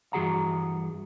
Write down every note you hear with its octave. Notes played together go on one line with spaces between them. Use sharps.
G2 E3 F#4 G#4 F#5 A#5